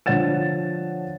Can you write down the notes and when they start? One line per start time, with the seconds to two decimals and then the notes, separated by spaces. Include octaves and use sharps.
0.06 D3 F3 C#5 F#5 A6 E7